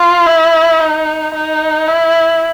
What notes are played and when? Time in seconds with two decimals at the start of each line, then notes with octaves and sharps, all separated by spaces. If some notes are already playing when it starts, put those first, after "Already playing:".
Already playing: F4
0.27 E4
0.80 D#4
1.35 D#4
1.88 E4